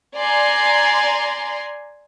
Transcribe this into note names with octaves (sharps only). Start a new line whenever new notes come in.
D5 G#5 A#5 C6